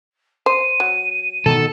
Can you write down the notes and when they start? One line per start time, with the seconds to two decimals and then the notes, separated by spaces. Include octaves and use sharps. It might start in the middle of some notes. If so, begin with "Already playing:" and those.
0.46 C5 D#7
0.80 F#3
1.46 B2 D#3 A4